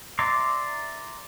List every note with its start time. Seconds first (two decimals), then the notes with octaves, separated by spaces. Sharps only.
0.19 D5 E5 A#5 C6 D6